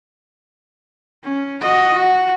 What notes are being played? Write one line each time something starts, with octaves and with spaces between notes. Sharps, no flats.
C#4
F#4 D#5
F#4